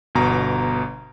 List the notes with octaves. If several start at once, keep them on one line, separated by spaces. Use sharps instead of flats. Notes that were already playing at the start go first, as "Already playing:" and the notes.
G1 B2 A#5